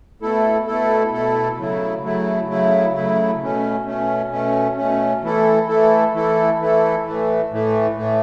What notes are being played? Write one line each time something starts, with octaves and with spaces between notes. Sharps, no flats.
B2 A3 E4 A4
B2 A3 E4 A4
B2 A3 E4 A4
C#3 F#3 A3 E4
C#3 F#3 A3 E4
C#3 F#3 A3 E4
C#3 F#3 A3 E4
B2 A3 C#4
B2 A3 C#4
B2 A3 C#4
B2 A3 C#4
E3 A3 E4 A4
E3 A3 E4 A4
E3 A3 E4 A4
E3 A3 E4 A4
A2 E3 A3
A2 E3 A3
A2 E3 A3